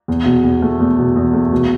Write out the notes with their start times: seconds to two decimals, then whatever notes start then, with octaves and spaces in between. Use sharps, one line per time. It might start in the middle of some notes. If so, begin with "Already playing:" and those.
0.08 E2
0.25 B2
0.44 E2
0.62 A3
0.80 E2
0.98 B2
1.16 E2
1.33 A3
1.52 B2